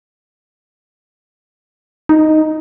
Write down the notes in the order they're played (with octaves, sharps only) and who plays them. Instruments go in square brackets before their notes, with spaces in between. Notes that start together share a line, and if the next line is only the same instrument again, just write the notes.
[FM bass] D#4